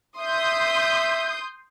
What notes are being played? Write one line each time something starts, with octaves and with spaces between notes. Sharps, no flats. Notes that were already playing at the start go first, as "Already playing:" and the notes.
E5 C6 D#6 G6